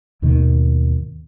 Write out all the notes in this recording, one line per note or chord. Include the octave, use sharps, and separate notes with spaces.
D#2 G#2 B2 D#3